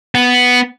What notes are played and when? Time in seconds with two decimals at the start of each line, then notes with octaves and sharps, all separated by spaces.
0.15 B3